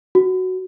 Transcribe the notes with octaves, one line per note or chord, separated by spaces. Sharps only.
F#4